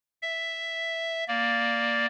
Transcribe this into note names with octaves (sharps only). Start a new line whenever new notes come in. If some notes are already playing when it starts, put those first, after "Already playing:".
E5
A#3 D5